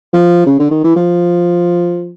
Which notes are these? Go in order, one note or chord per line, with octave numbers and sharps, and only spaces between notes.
F3
C#3
D3
D#3
E3
F3